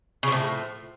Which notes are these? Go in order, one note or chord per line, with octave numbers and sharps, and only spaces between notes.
A2 C#3 F3